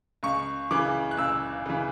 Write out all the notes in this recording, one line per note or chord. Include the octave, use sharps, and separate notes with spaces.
C#2 C#6
C#3 E3 D6
F#6
C#2 E6
C#3 E3